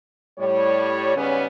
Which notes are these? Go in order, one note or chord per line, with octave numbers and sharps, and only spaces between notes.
A2 G3 C#5
G#2 C#3 G3 B3 C#4